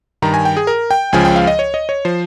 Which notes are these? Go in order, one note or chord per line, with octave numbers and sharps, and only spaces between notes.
G2 D#3 A#5
G#5
G5
G#4
A#4
G5
C#2 C#3 F3 G#5
G5
F5
D#5
C#5
D#5
C#5
F3 C5